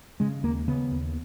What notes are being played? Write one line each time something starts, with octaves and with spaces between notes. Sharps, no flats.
C#3 G#3
D#2 A#3
C#3 B3
D#2